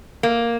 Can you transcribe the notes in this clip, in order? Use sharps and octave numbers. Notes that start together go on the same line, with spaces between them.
A#3